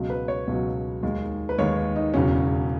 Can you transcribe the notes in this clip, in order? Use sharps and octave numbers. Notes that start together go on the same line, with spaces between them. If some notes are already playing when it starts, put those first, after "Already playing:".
Already playing: C#2 B2 F#3
B4
C#5
C#2 B2 F#3
D#2 D#3 G#3
B4
D#2 D#3 G#3 C#5
D#4
E1 E2 C#3 F#3 C#4